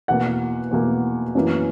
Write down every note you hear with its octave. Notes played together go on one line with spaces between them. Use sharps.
E2 B2 A#3 F#5
E2 B2 A#3
F#2 E3 A#3